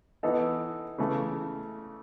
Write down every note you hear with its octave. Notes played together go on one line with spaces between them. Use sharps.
E3 B3 D#4 A4
C#3 E3 A3